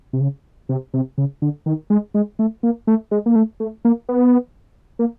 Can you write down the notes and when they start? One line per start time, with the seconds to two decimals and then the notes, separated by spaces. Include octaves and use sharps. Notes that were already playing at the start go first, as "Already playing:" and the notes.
0.13 C3
0.21 C#3
0.69 C3
0.94 C3
1.18 C#3
1.42 D3
1.66 D#3
1.90 G#3
2.14 G#3
2.39 A3
2.63 A#3
2.87 A3
3.11 G#3
3.26 A#3
3.36 A3
3.60 A3
3.85 A#3
4.09 B3
4.99 A#3